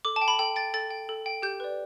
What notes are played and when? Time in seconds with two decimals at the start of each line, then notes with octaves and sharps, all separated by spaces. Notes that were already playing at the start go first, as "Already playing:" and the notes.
0.05 A4 D6
0.16 A5
0.21 G5
0.28 B5
0.39 A4 G5
0.56 G5 A6
0.74 A4 A6
0.91 G5
1.09 A4
1.26 G5
1.42 G4 G6
1.60 B4 D5